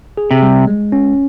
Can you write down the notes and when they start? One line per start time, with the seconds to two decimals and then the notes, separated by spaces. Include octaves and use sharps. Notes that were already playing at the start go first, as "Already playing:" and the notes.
0.17 G#4
0.31 C3
0.42 G3
0.67 G#3
0.92 C#4